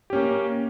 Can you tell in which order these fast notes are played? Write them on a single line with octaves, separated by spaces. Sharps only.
G4 C#4 A#3